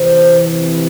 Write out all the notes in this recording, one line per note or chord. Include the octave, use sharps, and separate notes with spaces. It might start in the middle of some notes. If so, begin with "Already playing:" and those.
Already playing: C3 E3 C5